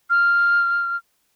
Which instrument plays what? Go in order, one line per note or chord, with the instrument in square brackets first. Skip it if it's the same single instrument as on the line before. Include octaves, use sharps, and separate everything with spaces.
[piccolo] F6